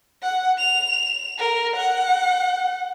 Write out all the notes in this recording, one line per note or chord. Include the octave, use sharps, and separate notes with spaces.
F#5
F7
A#4
F#5